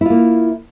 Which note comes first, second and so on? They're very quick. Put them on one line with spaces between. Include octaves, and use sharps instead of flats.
E4 F4 A#3